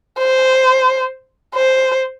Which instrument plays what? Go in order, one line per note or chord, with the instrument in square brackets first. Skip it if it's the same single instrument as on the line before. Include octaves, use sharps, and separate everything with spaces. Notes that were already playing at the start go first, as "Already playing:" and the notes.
[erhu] C5
C5